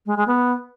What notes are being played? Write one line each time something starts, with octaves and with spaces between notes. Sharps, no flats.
G#3
G#3
B3